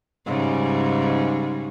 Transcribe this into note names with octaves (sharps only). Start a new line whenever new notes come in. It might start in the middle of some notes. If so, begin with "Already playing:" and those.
G#2 C#3 G3